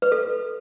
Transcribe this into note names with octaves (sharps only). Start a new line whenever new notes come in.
B4
A4